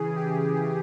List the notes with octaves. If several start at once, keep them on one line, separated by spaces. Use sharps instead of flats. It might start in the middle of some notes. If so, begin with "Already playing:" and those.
Already playing: C#3 E3 G#4
G4